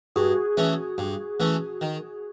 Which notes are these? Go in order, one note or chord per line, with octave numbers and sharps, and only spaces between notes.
G2 F#4 G#4
E3 A3 C#4
G2
E3 A3 C#4
D#3